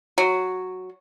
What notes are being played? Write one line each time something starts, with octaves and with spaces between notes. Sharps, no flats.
F#3